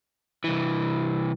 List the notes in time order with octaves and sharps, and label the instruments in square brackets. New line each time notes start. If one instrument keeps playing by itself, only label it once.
[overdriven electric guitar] C2 E3